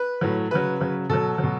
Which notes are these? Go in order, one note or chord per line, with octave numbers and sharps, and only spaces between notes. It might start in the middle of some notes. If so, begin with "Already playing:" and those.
Already playing: B4
A2 F#3
C#3 F#3 B4
C#3 F#3
B2 F#3 A4
F#3
B2